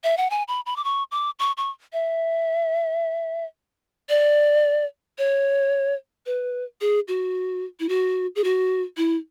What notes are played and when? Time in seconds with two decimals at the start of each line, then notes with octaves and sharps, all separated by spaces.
0.04 E5
0.17 F#5
0.30 G#5
0.48 B5
0.66 B5
0.76 D6
0.84 C#6
1.12 D6
1.39 C#6
1.57 C#6
1.93 E5
4.09 D5
5.18 C#5
6.26 B4
6.81 G#4
7.08 F#4
7.80 E4
7.89 F#4
8.36 G#4
8.44 F#4
8.97 E4